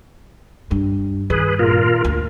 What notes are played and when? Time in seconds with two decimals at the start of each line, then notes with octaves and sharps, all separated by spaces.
0.71 G2
1.30 G2 D#3 G#4 B4
1.59 A#2 F4 A#4
2.05 D2